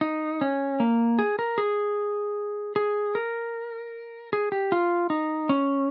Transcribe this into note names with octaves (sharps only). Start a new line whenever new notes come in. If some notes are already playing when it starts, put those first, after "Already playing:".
D#4
C#4
A#3
G#4
A#4
G#4
G#4
A#4
G#4
G4
F4
D#4
C#4